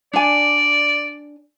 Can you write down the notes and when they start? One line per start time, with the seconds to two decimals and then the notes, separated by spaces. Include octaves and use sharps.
0.13 D4 D5 G#5